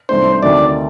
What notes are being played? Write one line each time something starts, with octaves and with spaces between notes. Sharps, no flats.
C2 C3 D#3 A3 D4 C5
D2 C3 D#3 A3 D5